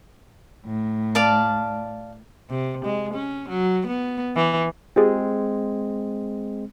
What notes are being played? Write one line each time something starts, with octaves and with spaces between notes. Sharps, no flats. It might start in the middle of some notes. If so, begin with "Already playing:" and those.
A2
D5 F5 A5
C3
G#3
C#4
F#3
B3
E3
G#3 C4 F4 G4 G#4